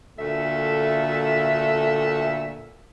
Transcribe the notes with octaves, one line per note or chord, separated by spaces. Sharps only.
D2 A#2 A3 A4 E5